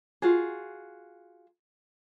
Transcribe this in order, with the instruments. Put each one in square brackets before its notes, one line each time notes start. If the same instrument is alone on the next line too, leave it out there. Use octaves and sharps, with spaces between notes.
[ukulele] F4 F#4 G#4